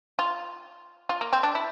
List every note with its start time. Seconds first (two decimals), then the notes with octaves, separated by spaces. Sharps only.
0.19 F4
1.09 F4
1.21 A#3
1.33 C4
1.43 D4
1.55 E4